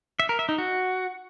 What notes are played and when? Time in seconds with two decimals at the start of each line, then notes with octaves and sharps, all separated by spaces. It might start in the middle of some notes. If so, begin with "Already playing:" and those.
0.20 E5
0.29 A#4
0.39 E5
0.49 D#4
0.58 F#4